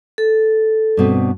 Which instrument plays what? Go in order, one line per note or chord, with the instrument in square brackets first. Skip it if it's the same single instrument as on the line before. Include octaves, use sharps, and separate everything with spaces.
[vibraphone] A4
[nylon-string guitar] G2 B2 C4